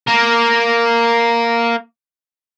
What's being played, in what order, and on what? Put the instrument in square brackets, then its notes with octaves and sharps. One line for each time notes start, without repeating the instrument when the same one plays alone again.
[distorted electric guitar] A#3 A#4